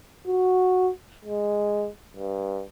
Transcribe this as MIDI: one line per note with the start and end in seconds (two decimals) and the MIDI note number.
0.27 0.91 66
1.25 1.88 56
2.17 2.63 43